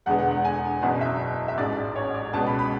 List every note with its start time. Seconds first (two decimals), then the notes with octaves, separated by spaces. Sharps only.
0.06 E1 E2 D3 G#3 B3 F#5
0.19 F#5
0.31 F#5
0.44 G#5
0.82 F#1 E2 B2 F#5
1.01 E5
1.48 E5
1.58 A1 G#2 G#3 D5
1.96 C#5
2.15 D5
2.33 C#2 B2 G#3 B3 A5
2.46 B5
2.59 B5